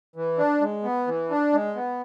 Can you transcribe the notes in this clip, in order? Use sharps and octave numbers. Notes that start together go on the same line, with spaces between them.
E3
D4
G#3
B3
E3
D4
G#3
B3